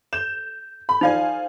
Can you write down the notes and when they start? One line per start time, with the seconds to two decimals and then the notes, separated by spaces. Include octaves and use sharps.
0.13 G6 E7
0.89 B5
1.01 F3 D#4 F4 D5 F5 G#5